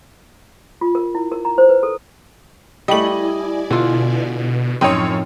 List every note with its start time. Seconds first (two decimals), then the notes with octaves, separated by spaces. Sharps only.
0.81 F4
0.95 A#4
1.15 E4
1.32 A#4
1.45 A#5
1.58 C5
1.69 B4
1.83 A4
2.88 G3 A3 E4 D5 D#5 G#5 F#7
3.70 B2 D3 F4
4.81 F#2 A2 F3 C4 D#4 C#5